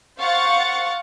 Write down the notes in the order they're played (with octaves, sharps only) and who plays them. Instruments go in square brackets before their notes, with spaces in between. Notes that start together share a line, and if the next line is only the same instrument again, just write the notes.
[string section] C5 F5 F#5 C#6 A6